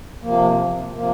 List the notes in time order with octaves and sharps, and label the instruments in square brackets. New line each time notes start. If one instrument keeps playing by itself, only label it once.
[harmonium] C3 F3 A#3
C3 F3 A#3